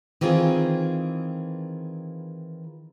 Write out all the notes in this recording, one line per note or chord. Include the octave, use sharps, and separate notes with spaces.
D#3 E3 C4 F4 G#4